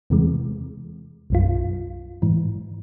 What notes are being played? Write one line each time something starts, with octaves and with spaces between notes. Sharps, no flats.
E2 C3 E3 G#3
B1 F#2 F4
G#2 E3